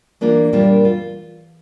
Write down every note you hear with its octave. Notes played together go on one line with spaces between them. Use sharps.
E3 A#3 D4 F4
A#2 G3 A#3 D4 F4
F4